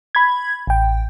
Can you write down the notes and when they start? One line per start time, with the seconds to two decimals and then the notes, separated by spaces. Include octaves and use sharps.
0.15 B5 G#6
0.67 A1 G5